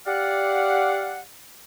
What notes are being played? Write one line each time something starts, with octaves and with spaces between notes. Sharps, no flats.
G4 D5 F5 F#5